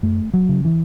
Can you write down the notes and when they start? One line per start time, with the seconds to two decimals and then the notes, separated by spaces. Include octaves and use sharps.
0.03 F#2 A3
0.34 F#3
0.49 C#3
0.65 E3